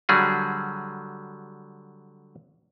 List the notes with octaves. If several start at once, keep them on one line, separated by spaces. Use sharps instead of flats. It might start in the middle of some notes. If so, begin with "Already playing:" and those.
D3 F#3 G3 G#4